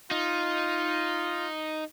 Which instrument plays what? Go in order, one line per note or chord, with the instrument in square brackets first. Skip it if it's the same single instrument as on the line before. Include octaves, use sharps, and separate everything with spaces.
[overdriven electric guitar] D#4 [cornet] F4